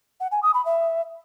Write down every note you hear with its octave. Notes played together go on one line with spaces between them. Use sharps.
F#5
G#5
D#6
B5
E5